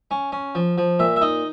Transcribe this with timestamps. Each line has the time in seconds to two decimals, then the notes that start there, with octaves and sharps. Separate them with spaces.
0.11 C#4
0.32 C#4
0.55 F3
0.78 F3
0.99 A#2 E5
1.16 E5
1.21 D#4 D#5